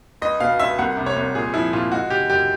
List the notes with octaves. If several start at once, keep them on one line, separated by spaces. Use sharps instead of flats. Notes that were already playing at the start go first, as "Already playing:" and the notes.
C#2 D#5
B2 F5
C#2 E5
C2 F#5
C3
C#5
C2
A#2 G#4
F3 E4
A#2 F4
G#3 F#4
C#3 G4
F#2 G4